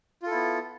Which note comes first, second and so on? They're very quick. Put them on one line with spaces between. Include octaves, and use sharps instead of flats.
F4 A4 E4 B3